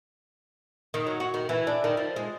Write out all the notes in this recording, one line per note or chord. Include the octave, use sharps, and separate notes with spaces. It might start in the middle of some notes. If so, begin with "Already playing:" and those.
D#3
F#3
F#4
D#3
E3
D4
D#3
F3
G#3